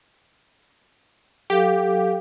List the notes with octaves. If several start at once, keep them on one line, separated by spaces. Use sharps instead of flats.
F#3 G4 A4 F5